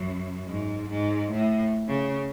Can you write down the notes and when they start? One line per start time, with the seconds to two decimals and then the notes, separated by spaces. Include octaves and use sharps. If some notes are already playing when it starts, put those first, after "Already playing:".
Already playing: F#2
0.47 G#2
0.89 G#2
1.31 A2
1.88 C#3